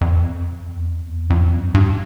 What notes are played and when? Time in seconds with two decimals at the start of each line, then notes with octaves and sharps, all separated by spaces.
0.01 F2
0.74 E2
0.88 F2
1.09 E2
1.30 F2
1.53 F#2
1.74 G2